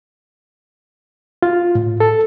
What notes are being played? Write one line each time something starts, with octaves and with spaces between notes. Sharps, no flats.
F4
A2
A4